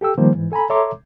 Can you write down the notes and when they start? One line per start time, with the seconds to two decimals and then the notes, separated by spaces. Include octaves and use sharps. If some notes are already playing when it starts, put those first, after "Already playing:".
0.01 G4 A4 G5 E6
0.18 D#3 F3 G3 A#3 C5
0.34 G#2 E3
0.52 A4 G#5 A#5 B5
0.70 A4 C#5 E5 A#5 C6 D6